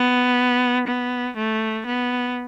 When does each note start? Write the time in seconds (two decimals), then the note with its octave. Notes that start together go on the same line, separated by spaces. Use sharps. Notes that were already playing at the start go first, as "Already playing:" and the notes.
Already playing: B3
0.88 B3
1.37 A3
1.87 B3